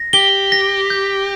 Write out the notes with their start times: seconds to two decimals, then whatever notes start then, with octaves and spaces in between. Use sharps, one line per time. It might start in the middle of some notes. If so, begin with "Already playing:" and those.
Already playing: A#6
0.13 G4 G7
0.52 A#6
0.90 G6